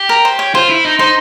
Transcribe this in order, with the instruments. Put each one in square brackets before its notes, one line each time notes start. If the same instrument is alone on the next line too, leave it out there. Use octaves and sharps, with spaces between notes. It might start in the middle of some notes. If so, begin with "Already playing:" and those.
Already playing: [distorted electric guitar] G4
[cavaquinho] A#4
C5
C#5
[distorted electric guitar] F4 [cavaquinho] C5
[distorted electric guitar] E4
D#4
[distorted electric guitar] D#4 [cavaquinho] C5